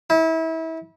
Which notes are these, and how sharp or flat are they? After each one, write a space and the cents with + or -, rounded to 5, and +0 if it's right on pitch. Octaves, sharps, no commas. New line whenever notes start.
E4 -30